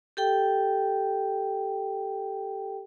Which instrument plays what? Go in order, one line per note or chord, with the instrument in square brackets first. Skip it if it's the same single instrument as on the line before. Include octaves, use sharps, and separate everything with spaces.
[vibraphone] G4 A4 G5